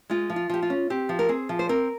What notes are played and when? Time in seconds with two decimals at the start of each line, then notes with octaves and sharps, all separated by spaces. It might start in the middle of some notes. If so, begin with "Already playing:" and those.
0.10 G#3 F4
0.30 F3
0.36 F4
0.49 F3 G4
0.62 F4
0.70 C#4
0.90 C4 G4
1.09 F3
1.19 A#4
1.29 C4 G#4
1.49 F3
1.59 C5
1.69 C4 A#4